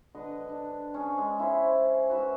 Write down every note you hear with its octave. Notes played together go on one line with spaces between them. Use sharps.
D3 B4 D#5
D4
C#4 G#4 G#5
G#3
C#4 E4 G4 C5
F#4 B4 E5